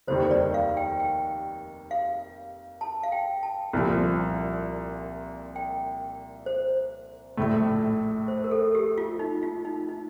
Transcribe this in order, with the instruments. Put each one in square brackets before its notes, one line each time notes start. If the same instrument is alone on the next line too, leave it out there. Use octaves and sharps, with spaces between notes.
[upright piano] F1 D#2 D#3 G3 [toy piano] C5
[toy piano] D5
F5
G5
G5
F5
A5
F5
G5
A5
[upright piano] C2 A#2 F3
[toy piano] G5
C5
[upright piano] A#1 A2 A3
[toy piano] C5
A#4
A4
G4
F4
D#4
F4
D#4
D#4